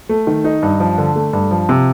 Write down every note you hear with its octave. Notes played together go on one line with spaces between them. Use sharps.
A3
D#3
D#4
G2
F3
D3
A3
G2
F3
C3